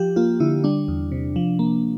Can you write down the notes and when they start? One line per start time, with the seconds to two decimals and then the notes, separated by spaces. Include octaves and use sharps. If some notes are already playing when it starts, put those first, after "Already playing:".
Already playing: F3 G4
0.16 A#3 F4
0.40 D3 E4
0.64 G3 D4
0.88 E2
1.12 C3
1.36 F3
1.59 A#3